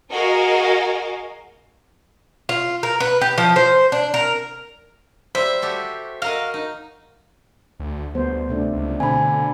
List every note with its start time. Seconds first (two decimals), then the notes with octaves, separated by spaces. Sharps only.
0.11 F#4 G#4 A#4 D#5 F5
2.49 F4
2.83 A#4
3.00 B4
3.21 G4
3.38 F3
3.56 C5
3.92 D4
4.14 A#4
5.35 G3 C5 E5
5.62 F#4 G4 A4
6.22 F#4 A#4 D#5 F5
6.54 D#4
7.80 D2
8.14 D2 G3 B3 C5
8.49 C3 A3 D4
8.73 C#2
9.00 B2 D3 C4 G#5 B5